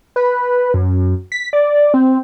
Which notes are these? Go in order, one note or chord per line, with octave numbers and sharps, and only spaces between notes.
B4
F#2
B6
D5
C4